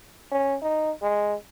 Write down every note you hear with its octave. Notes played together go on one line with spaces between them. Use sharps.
C#4
D#4
G#3